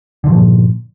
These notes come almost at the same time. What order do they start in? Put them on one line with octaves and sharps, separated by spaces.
D3 F3 G2 A#2